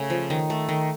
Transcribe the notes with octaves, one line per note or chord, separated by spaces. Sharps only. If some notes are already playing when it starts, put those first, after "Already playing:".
Already playing: C#3 A3 A4
F3
D#3
A3
D#3